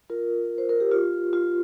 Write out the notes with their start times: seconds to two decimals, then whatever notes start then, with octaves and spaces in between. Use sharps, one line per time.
0.10 F4 A#4
0.58 C5
0.69 A#4
0.80 G4
0.92 F4
1.33 F4